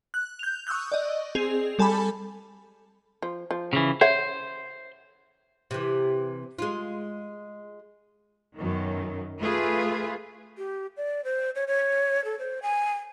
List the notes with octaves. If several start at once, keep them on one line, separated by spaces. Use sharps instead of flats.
F#6
G6 F7
C#6 D#6 E6 F#6 G6
D5 D#5
C4 G#4 F7
G3 A4 G#5 A5 B5
F3
F3
C#3 E3
C5 C#5 E5 F#5
C3 E3
G#3 F4
F#2 B2 D#3
A3 F4 G#4 B4
G4
D5
C5
C#5
C#5
A4
C5
G#5